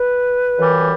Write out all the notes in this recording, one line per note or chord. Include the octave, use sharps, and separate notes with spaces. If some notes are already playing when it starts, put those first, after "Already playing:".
Already playing: B4
F#2 E3 G3